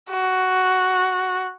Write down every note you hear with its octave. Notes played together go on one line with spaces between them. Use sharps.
F#4